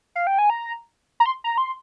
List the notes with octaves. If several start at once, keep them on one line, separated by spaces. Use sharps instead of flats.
F5
G5
G#5
A#5
A#5
C6
A#5
C6